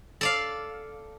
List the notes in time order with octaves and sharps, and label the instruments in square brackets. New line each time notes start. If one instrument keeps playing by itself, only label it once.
[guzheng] A4 D5 F5